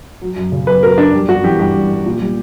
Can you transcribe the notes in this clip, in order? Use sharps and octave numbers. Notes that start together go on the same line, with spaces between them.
F#3
F#2
C#3
F#2 B4
F#3 A#4
F#2 D4
G3
G2 F#4
E3 G4
G2 G4
G3
G2
A#2
G3